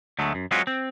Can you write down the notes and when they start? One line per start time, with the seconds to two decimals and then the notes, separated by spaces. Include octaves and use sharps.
0.19 D2 F#3 G#3 A3
0.35 F#2
0.51 F#3 G#3 C4 C#4 F4 F#4
0.67 C4